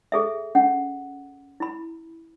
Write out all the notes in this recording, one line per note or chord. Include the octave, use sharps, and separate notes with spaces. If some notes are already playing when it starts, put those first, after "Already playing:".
G#4 A4 E5
C#4 F#5
E4 B5